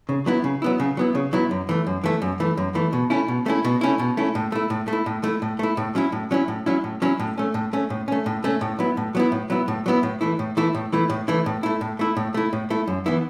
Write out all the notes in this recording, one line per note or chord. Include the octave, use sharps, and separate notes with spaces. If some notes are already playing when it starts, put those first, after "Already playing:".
C#3
F#3 B3 E4
C#3
F#3 B3 E4
C#3
F#3 B3 E4
C#3
F#3 B3 E4
F#2
E3 A3
F#2
E3 A3
F#2
E3 A3
F#2
E3 A3
B2
A3 C#4 E4
B2
A3 C#4 E4
B2
A3 C#4 E4
B2
A3 C#4 E4
A2
A3 E4
A2
A3 E4
A2
A3 E4
A2
A3 E4
A2
F#3 C#4 E4
A2
F#3 C#4 E4
A2
F#3 C#4 E4
A2
F#3 C#4 E4
A2
A3 C#4
A2
A3 C#4
A2
A3 C#4
A2
A3 C#4
A2
F#3 B3 E4
A2
F#3 B3 E4
A2
F#3 B3 E4
A2
F#3 B3 E4
A2
E3 A3 E4
A2
E3 A3 E4
A2
E3 A3 E4
A2
E3 A3 E4
A2
A3 E4
A2
A3 E4
A2
A3 E4
A2
A3 E4
F#2
E3 B3 E4